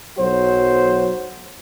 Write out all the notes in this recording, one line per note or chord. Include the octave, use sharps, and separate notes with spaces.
B1 F#3 F#4 C5